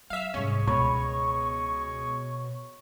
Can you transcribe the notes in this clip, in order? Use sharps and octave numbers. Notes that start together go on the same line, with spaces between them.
F#3 E5 F5
C2 G#2 C#4 G#4 D#5 C#6
C#2 B2 C#4 C#5 B5